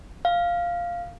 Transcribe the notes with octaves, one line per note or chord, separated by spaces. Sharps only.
F5